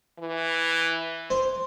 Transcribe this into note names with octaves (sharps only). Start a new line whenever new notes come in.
E3
C5